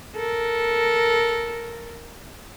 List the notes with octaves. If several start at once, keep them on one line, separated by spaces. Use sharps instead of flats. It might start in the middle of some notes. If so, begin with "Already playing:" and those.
A4 A#4